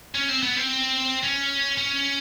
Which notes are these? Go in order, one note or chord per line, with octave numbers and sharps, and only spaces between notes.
C#4
C4
B3
C4
C#4
C#4